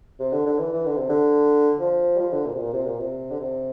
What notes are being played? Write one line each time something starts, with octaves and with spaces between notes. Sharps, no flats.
C3
D3
D3
E3
E3
D3
C3
D3
F3
G3
F3
D3
A#2
C3
A#2
C3
A#2
C3
D3
C3